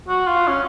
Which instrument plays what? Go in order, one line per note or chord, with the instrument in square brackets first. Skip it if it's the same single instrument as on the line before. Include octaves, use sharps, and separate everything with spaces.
[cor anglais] F#4
F4
C#4